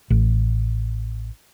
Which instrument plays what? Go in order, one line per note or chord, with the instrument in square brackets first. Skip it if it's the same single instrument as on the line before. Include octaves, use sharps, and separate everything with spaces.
[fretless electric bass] A1